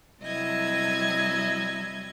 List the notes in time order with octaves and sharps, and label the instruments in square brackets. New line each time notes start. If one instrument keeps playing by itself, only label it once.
[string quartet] C3 F#3 G3 E4 D#5 G#6